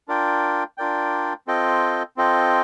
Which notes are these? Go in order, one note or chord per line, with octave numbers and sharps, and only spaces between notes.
D4 F4 A#4 D5 G5
D4 F4 A#4 D5 G5
C4 F4 A4 D#5 G5
C4 F4 A4 D#5 G5